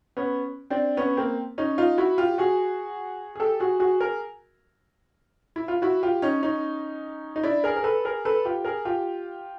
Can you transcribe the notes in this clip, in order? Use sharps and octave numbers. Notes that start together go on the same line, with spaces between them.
B3 C#4
C4 D4
B3 C#4
A#3 C4
C#4 D#4
D#4 F4
E4 F#4
F4 G4
F#4 G#4
G#4
G4 A4
F#4 G#4
F#4 G#4
G#4 A#4
E4
F4
E4 F#4
F4 G4
C#4 D#4
C#4 D#4
D#4
D4 E4
G#4 A#4
A#4
A4 B4
G#4 A#4
A4 B4
F4 G4
G#4 A#4
F4 G4